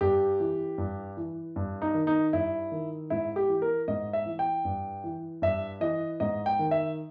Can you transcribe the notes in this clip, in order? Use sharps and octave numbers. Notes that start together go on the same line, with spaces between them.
G2 G4
E3
G2
E3
G2
D#4
D#3
D#4
G2 E4
D#3
G#2 E4
G4
E3
A#4
G#2 D#5
E5
E3
G5
G2
E3
G2 E5
E3 D#5
G#2 D#5
G5
D#3
E5